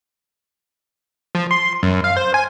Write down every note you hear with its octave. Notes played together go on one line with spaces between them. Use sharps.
F3
C6
F#2
F5
C5
G#5